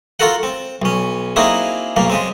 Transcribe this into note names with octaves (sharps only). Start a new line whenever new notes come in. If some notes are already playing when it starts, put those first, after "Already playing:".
F4 F#4 A4 A#4 F#5
C4
B1 C#4
A#3 C4 D#4 E4 F#4 G#4
B1 C#3 A#3
C#3 G#3 C4